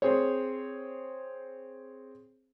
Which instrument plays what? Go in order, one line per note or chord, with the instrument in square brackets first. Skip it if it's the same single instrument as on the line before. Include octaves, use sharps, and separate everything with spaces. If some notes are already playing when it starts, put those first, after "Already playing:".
[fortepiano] C4 G#4 C5 C#5